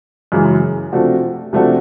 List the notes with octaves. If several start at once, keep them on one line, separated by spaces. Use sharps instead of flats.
F#2 C#3 E3 G#3
C3 F3 A3 D4 F#4
C3 F3 A3 D4 F#4